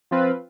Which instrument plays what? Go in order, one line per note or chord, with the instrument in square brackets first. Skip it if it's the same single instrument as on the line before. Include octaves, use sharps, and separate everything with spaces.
[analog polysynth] F3 C4 F4 B4